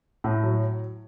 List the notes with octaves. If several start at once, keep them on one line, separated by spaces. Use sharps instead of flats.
A2
F#3